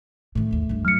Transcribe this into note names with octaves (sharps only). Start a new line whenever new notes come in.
A2 D#3 A3
G#1 D#2
G2 G3
F#3 F6 C#7